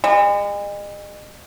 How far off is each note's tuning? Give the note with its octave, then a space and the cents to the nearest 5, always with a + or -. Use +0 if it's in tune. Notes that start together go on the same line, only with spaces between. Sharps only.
G#3 -40